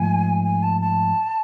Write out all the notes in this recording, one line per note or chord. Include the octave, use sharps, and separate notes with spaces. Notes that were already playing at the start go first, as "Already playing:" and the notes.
Already playing: G#2 F3 A3 G#5
G#5
A5
A5